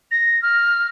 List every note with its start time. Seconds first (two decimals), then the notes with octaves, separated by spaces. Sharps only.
0.11 A#6
0.42 F6